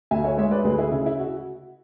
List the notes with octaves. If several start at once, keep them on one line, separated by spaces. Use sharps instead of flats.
D2 E5 G#5
C#5 E5
G#3 C#5 E5
B4 D5
D2 G#4 B4
E4 G#4
C#3 E4
E4
F#4